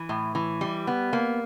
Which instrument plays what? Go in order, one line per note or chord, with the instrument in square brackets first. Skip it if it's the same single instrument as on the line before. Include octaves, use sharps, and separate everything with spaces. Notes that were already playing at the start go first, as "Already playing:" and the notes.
Already playing: [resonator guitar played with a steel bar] E3
A2
E3
G3
B3
A#3